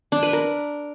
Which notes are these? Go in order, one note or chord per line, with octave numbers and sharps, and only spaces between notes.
D4
B4
A#4